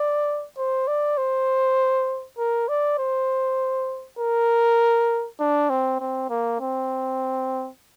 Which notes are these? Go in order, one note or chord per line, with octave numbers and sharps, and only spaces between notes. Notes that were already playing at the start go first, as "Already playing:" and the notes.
Already playing: D5
C5
D5
C5
A#4
D5
C5
A#4
D4
C4
C4
A#3
C4